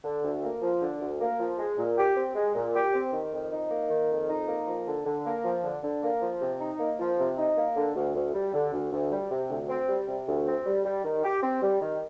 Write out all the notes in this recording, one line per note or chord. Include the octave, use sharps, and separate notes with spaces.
D3
D2
A#3
F3
D3
D2
A#3
F3
G#3
A#2
G4
C4
G#3
A#2
G4
C4
D#3
F2
D#4
A#3
D#3
F2
D#4
A#3
F3
D3
D3
A#3
F3
D3
D3
A#3
F3
C3
D#4
A#3
F3
C3
D#4
A#3
D3
D2
D2
G3
D3
D2
D2
G3
C3
D2
C4
G3
C3
D2
C4
G3
G3
D#3
G4
C4
G3
D#3